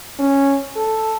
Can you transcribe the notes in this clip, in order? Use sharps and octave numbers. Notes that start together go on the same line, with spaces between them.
C#4
A4